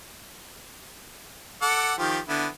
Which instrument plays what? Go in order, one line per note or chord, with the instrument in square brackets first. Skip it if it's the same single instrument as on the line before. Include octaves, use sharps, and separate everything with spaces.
[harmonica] A4 F#5 D6
D#3 F3 G4
D3 B3 E4